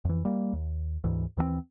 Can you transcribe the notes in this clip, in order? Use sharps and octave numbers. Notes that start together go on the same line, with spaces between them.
F2 E3
G3 A#3
D#2
D2 G#2 E3
D#2 E3 F#3 C4